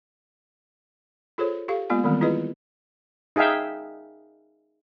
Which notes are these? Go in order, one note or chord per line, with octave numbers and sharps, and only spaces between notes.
F4 G#4 A4 C5 C#5
G4 A4 F5
G#3 A#3 B3 F4 G#5
D#3 E3 G3 G#3 B3 C4
E4 F4 G#4 B4 D#5
D#4 G#4 E5 F5 G5